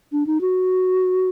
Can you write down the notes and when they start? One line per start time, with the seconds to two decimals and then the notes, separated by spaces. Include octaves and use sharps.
0.12 D4
0.27 D#4
0.41 F#4